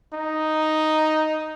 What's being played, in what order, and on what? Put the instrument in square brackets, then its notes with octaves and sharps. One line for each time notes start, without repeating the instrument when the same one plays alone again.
[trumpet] D#4